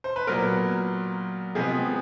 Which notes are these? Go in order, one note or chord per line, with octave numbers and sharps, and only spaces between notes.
C5
B4
A#2 F#3 B3 A#4
C3 F3 G#3 B3 G#4